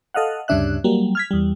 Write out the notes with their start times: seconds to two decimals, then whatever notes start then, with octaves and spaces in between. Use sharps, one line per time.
0.14 A4 D#5 F5 F#5
0.48 D2 G2 C#3 D4 E5 F#6
0.84 F#3 G3 A#3
1.15 F6 G#6 B6
1.31 E2 G3